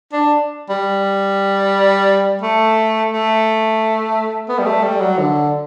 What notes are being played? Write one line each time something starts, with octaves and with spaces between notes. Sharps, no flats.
D4
G3
A3
A3
B3
G3
A3
G3
F#3
D3